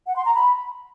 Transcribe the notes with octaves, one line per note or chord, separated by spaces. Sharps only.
F#5
C6
A#5
B5